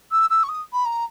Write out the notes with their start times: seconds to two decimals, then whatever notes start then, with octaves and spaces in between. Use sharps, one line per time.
0.11 E6
0.30 E6
0.43 C#6
0.49 D#6
0.73 B5
0.85 A#5